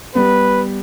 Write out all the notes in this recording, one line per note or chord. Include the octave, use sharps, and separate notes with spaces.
G3 B3 B4